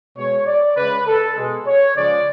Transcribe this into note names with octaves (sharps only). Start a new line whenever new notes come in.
B2 G#3 C#5
D5
C#3 G#3 B4
A4
B2 G#3
C#5
C#3 F3 G#3 D5